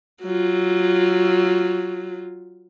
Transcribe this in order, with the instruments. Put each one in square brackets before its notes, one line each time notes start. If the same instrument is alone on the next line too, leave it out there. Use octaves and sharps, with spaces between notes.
[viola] F#3 F4